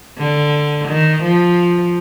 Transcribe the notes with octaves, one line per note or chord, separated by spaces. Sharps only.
D3
D#3
F3